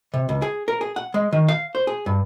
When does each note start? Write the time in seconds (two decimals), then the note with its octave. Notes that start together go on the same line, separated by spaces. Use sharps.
0.14 C3
0.29 C#2
0.42 G#4
0.68 A#4
0.81 G#4
0.96 F#5
1.14 G#3
1.32 D#3
1.48 F5
1.75 C5
1.87 G#4
2.06 G2